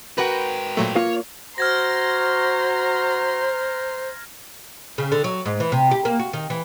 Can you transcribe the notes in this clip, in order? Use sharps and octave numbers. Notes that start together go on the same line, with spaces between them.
G#2 F#4 A#4 B4 G5
A#2 F#3 A3
A#3 F4 C#5 F5
F#4 C5 A#5 C6 F6 G#6 A#6
C#3
D3
F#3
G#2
E3
C3
G4
A#3
F#4
D#3
E3